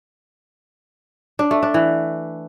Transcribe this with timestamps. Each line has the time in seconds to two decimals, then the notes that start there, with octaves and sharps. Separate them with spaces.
1.39 D4
1.51 A3
1.63 D4
1.74 E3